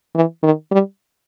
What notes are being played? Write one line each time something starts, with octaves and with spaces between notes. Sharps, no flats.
E3
D#3
G3